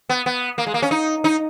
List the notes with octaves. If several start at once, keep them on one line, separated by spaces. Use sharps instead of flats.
B3
B3
A#3
G#3
A#3
C#4
D#4
D#4